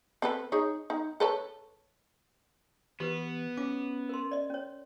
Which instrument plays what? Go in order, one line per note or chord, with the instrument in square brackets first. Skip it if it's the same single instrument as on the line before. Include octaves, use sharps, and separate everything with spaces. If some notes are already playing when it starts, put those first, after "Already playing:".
[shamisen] C4 A4 B4
D#4 G#4 C#5
D#4
A4 B4 C#5
[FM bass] E3 [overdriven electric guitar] B3 [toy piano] G4 B4
[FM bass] C#4 [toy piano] D6
[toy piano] A#4 C6
D5 D#5
C#4 C#5